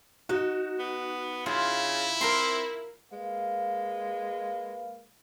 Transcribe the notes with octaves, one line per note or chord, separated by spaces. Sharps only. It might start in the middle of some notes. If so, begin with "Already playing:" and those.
D#4 F#4
B3
C#3 E4 F4
C4 A#4 A#5 C6
G#3 A#3 B4 F5